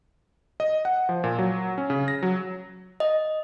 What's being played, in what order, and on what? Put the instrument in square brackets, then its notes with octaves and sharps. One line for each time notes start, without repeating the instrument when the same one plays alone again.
[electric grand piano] D#5
F#5
F3
A#2
F#3
C#4
C#3
A#6
F#3
[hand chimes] D#5